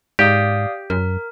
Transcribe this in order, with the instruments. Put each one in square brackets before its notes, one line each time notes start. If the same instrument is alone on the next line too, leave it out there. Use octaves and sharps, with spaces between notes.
[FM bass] G#2 [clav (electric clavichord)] G4 [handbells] D5 F5 D#6
[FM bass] F#2 [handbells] A#4